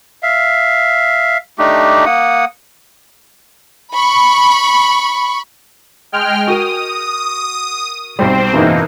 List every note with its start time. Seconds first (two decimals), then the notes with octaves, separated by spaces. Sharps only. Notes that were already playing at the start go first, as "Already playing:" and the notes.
0.23 E5 F5
1.59 A3 D4 D#4 G4
2.06 A#3 F#5 D#6
3.93 B5 C#6
6.12 G#3 G5 F6
6.47 F#4 A#4 D#6
8.19 B1 G3 C4 C5
8.53 F#1 G#2 B2 E3 A#3 D#4